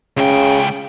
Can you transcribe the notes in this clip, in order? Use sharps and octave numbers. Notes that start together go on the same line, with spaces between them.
C#2 C#3 G5